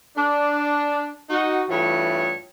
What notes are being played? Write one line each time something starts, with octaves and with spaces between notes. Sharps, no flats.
D4
D#4 F#4
G2 E3 A3 F4 C#5